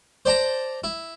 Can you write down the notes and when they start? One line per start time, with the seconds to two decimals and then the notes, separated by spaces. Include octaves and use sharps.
0.25 C5 D5 A5 A#5
0.84 E4